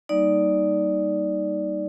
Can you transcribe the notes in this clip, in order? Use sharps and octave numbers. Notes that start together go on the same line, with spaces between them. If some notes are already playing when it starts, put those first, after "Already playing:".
G3 A#3 D#4 D5